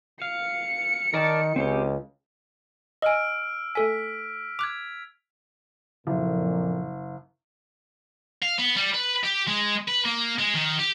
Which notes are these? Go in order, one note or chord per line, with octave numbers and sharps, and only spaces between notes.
F5 C#7
D#3 A#4 D5 A5
C#2 C4 C#4 G4
D#5 G#5 E6 F6 D7
A3 A4 G#5 B6
D6 F#6 G#6 F7
F#1 F2 A#2
F5
B3
G3
B4
G4
G#3
B4
A#3
G#3
D#3
G4